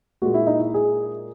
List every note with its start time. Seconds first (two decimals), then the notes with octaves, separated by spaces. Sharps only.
0.22 A#2 G#3 F#4
0.34 E4
0.47 D#4
0.59 E4
0.74 G#4